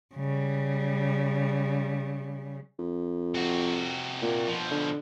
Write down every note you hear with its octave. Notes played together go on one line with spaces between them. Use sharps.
C#3 G3
F2
C3 F#4
A#2
B2 F3
D3